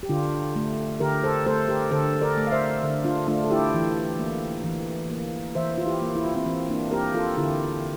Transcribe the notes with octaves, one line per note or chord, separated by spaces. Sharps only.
G4
D3 D4 F4
A3
D3 G4 A#4
A4 C5
A3 A4 C5
G4 A#4
D3 A4 C5
A#4 D5
A3
F5
C5 E5
D3
D4 F4
A3 D4 F4
A4
E4 G4
E3
A#3
E3
A#3
E3 C5 E5
F4
E4 G4
A#3
E4
F4
C4 E4
E3 C4
A#3 D4
A#3 G4 A#4
F4 A4
D3 E4 G4